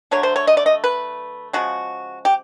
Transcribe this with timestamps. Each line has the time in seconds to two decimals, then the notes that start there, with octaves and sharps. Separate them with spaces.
0.11 D3 F#3 A3 C#5
0.23 C5
0.36 C#5
0.47 D#5
0.57 D5
0.66 D#5
0.84 B4
1.53 C#3 F3 G#3 F#4
2.25 G4